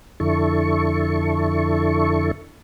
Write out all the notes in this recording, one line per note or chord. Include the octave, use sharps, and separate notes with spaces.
F2 D3 E4 A4 C#6